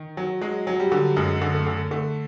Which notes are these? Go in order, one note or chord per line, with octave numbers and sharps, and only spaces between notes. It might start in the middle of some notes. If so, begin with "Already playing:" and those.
Already playing: D#3
F#3
F#3 G#3
F#3
G3
D3
F#2 G#3
D3
A3
D3
D3 A3